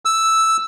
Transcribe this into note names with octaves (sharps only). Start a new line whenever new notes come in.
E6